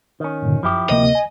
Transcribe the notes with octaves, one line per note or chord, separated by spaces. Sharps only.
D#3 C#4
G2 A#2 D3
F#2 F3 E4 G4
D2 C3 A#3 D#5
G#5